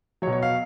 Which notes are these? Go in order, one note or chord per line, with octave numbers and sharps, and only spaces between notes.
F#3 C#5
B2
C#5
F5